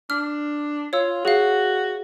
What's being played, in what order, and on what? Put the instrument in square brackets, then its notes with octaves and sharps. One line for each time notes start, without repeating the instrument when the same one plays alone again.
[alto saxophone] D4 [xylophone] F6
[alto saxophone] F4 [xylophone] C#5 E6
[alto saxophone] F#4 [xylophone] G#4 F5